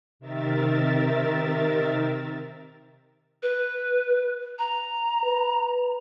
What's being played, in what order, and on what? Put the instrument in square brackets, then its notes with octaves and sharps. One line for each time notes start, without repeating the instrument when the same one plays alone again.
[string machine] C3 D#3 A#4 E5 A6
[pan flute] B4
A#5
[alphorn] B4